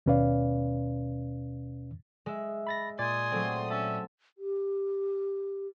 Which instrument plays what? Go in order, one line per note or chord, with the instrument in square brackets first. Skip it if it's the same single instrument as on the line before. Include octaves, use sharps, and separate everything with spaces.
[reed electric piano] D#2 B2 C#4 B4 D5 F5
[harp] G#3 E5
[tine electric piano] B5 A6 A#6
[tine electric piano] A#2 D5 A6 [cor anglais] G#5 [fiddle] C6 D#6
[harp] F#3 A3 C4
[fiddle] C#4 [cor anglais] E5 [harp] A5
[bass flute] G4